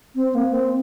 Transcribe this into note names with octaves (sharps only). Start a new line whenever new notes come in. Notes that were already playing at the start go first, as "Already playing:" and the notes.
C4
A#3
C4